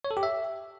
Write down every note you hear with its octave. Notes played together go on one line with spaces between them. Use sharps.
C#5
A4
G4
E5